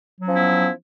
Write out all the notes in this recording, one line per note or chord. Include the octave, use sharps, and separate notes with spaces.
F3 F#3 B3 C#4 E4